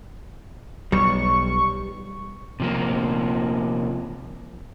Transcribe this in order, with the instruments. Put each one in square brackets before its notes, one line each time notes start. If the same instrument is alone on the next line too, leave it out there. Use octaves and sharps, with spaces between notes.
[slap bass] B1 [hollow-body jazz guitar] G3 [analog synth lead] C#6
[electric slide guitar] C3 F3 A#3